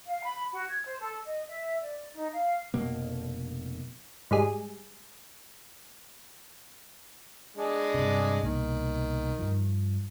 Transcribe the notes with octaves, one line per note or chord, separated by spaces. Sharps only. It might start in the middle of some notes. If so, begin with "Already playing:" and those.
F5
B5
F#4
G#6
C5
A4
D#5
E5
D5
D#4
F5
F1 B2 A#3
G#2 G3 G#4
G#3 D4 G#4
G2 C3
C2 B2 D#3 A#3
G2 F3